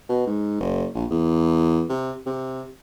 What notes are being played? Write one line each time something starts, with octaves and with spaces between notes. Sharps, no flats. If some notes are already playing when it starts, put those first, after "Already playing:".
B2
G#2
F#1
A#1
E2
C3
C3